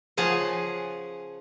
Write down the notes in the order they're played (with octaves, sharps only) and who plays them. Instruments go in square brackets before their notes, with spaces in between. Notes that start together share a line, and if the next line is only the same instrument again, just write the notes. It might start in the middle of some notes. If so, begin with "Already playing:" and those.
[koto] C#3 F3 G#4 F5 F#5